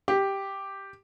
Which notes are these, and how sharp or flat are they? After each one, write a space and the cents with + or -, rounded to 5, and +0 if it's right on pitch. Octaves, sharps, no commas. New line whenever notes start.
G4 +0